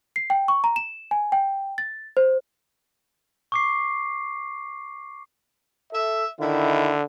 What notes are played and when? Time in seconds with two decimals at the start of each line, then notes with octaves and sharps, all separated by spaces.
0.16 C7
0.30 G5
0.48 C#6
0.64 A#5
0.76 E7
1.11 G#5
1.32 G5
1.78 A6
2.17 C5
3.52 C#6 D6 C7
5.93 A4 E5
6.41 D3 D#3 E4